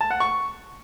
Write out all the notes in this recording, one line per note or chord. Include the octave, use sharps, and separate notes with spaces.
A5
F#5
C#6